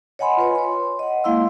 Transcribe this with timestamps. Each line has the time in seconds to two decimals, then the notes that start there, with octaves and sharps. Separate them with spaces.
0.19 C#5 D#5 F#5 G#5 B5 C6
0.37 F4 B4 C#5
0.55 C#5 C6
0.99 D#5 F#5
1.24 G#3 A#3 E4 F5 C6 E6